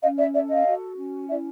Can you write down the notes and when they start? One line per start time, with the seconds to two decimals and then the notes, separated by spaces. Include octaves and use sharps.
0.02 C#4 D#5 F5
0.18 D5 E5
0.34 A4 D5 E5
0.50 D#5 F5
0.66 F#4
0.97 C#4
1.28 E4 D5 E5